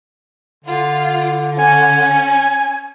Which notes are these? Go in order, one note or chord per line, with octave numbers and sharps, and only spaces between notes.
D3 F4
C#4 G#5